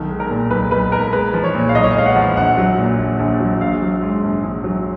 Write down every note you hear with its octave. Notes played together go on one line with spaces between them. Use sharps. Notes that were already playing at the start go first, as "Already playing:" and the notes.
Already playing: B1 D#3
G#3
A#4
A#2
B1 B4
B1 B4
G#3 A#4
G#3 B4
F3
C#5
A#2
F5
B1 D#5
C#5
D#5
G#3 F5
F#5
F3
A#1 F#5
F#3
A#2
A#1
A#1
F#3
A#1 F5
F#3
G#2
A#1
A#1
F#3